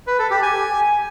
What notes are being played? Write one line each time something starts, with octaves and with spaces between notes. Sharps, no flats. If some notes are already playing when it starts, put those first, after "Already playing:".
B4
A4
G4
G#5